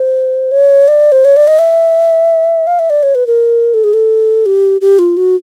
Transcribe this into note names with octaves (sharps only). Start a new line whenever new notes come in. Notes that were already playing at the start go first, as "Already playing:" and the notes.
Already playing: C5
C#5
D5
C5
C#5
D5
D#5
E5
F5
E5
D5
C#5
B4
A#4
A4
G#4
A4
G4
G4
F4
F#4